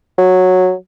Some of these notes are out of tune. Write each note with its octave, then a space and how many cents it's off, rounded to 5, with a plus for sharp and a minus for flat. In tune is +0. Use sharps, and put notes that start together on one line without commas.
F#3 -10